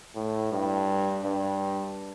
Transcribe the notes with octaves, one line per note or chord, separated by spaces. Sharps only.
A2
G2
G2